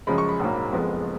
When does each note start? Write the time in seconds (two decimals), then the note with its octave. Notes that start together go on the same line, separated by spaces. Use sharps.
0.07 F#2 C#3 F3 G#3 B5
0.18 C#6
0.29 B5
0.40 A#1 G#2 F#3 A#3
0.72 F#1 F2 F3 G#3 B3